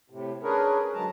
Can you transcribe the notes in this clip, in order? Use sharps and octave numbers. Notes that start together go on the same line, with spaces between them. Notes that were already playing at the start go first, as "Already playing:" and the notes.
A2 C3
C#4 D4 G#4 A#4 B4 C#5
D3 F#3 G#3 A5 A#5